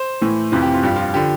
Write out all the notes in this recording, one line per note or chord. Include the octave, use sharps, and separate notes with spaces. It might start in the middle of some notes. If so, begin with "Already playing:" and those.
Already playing: C5
A2 E3
F2 C3 E3 F4
G4
F4
G2 F3 G4
F4
D3 F3 G4